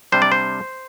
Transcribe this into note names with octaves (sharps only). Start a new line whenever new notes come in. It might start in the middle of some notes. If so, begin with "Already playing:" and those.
C3 G3 D4 C5
D5
C5